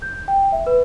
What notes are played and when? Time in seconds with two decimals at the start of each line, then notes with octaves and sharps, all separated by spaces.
0.02 G6
0.28 G5
0.52 E5
0.67 B4